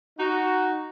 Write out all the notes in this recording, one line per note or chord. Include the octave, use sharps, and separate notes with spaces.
D#4 F#4